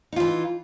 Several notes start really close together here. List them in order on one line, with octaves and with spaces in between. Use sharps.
D#4 F4 E3